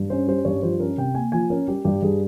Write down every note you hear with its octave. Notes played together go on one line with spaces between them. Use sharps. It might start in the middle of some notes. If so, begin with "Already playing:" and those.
Already playing: G2
C#4 C5
G3 C5
G2 C#5
F3 C5
C#4 A#4
C3 G5
A#3 G#5
F3 G#5
C#4 A#4
G3 G4
G2 G4
G2 G#4